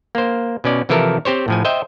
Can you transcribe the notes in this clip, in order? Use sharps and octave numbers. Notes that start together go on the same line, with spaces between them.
A#3 C5
B2 C#4 D5
C3 E3 F3 E4 A4 A#4
C4 G4 C5 C#5
A2 F3 G#5
C5 D#5 E5 G5